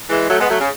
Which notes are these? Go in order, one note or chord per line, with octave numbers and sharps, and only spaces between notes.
E3 G#3
F#3 A3
G#3 B3
F#3 A3
C#3